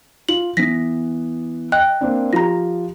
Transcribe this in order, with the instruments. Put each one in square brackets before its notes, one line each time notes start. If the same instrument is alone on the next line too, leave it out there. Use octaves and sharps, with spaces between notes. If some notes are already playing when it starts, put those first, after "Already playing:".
[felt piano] F4 [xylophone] F#7
[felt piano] E3 B3 [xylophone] A#6 B6
[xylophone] D#5 G5 F#6
[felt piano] A#3 C4 D4
[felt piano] F3 F4 G4 [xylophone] A#5 A#6